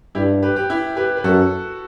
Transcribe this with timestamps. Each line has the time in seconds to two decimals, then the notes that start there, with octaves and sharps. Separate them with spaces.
0.15 G2 E4 G4
0.43 G4 B4
0.56 G4 B4
0.70 E4 G4
0.96 G4 B4
1.17 B4
1.24 F#2 F#4 A4